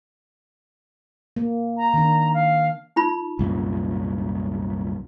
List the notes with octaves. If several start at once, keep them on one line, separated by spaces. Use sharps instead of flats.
A#3
A#5
D#3 D4
F5
D#4 F4 B5
C2 F#2 A#2